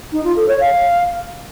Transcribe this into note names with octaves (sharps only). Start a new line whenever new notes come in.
D#4
F4
A4
C#5
F5